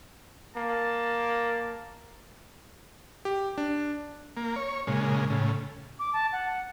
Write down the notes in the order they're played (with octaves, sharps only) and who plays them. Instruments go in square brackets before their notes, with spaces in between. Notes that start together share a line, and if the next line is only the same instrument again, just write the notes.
[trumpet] A#3 [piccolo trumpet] A5
[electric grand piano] G4
D4
[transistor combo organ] A#3
C#5
A#2 C#3 G#3
A2 C#3
[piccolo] D6
A5
F#5